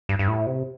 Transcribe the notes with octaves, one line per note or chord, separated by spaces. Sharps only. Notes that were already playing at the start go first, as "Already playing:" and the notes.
G2
G2
A2
C3